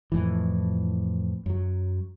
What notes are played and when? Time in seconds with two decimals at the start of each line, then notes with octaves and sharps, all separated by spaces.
0.12 F2 A2 E3
1.46 F#2 F#3